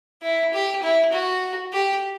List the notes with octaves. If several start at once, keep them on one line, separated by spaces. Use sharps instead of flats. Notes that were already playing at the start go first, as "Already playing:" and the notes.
E4
G4
E4
F#4
G4